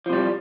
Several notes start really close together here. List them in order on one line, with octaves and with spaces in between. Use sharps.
F3 C3 G3